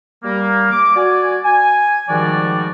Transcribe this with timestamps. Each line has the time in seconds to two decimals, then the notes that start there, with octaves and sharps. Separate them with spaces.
0.25 G3 A#3
0.72 D6
0.96 F#4 D5 G#5
1.45 G#5
2.09 G#2 D#3 F3 G3 F#4 D5